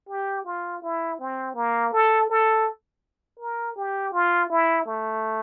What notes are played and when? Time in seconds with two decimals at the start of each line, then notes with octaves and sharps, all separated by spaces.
0.09 G4
0.45 F4
0.83 E4
1.19 C4
1.55 A#3
1.93 A4
2.30 A4
3.40 A#4
3.76 G4
4.13 F4
4.50 E4
4.86 A3